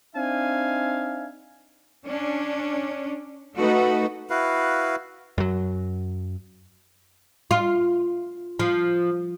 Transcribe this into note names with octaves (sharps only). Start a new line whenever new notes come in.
C4 D4 D#4 E5 F5 G#5
C#4 D4
A3 D#4 F#4 A4 B4
E4 F#4 B4 F5
F#2 F#3
F4
F3